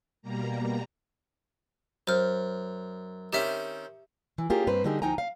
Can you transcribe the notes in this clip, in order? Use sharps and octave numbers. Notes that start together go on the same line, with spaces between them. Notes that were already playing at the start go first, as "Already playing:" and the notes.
B2 G3 A#3 A#5
F#2 C5 F6
D#3 C4 C#4 G4 E5
E3
A#3 C#4 F4 G4 G#4
G2 A#3 C4 B4 C5
D3 G3 A#3 D#4 G4 G#4
D2 F3 D#4 G5 G#5 A#5
F5